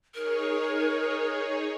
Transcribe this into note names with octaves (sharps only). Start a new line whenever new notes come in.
D#4 G#4 A#4 C#5